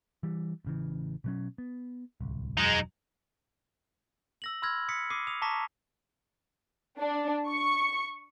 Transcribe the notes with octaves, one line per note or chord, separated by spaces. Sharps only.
E3 G3
A1 C#3 E3
B2 F#3 C#4
B3
D1 C2
E1 F#2 F#3 G#3 D#4
E6 A#6 F#7
B5 C6 E6 F6 G#6 A#6
D#6 B6 C#7
D6 D#6 C7 D#7
D#6 F7
A5 A#5 C#6 D6 A#6 B6
D4
C#6